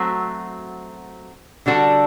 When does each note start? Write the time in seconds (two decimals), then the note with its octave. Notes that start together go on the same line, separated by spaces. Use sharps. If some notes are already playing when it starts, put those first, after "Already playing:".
Already playing: F#3 A3 C4 F#4
1.66 D3 G3 D4 F#4 A4